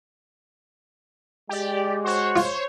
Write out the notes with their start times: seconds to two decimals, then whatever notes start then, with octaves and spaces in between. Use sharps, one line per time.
1.49 G#3 G4 D5
2.05 F#4 C5 C#5
2.36 F4 C5 C#5